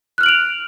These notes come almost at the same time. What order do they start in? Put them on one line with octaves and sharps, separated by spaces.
F#6 F6 F#7 D7 F7